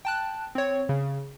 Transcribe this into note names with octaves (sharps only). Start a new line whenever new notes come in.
G5 A5 F#6
C4 C#5
C#3